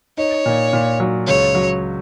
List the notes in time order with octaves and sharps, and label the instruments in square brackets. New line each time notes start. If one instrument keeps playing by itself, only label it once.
[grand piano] D#4 [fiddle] C#5
[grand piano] A#2
A#2
F#3
[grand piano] C#2 [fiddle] C#5
[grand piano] F#3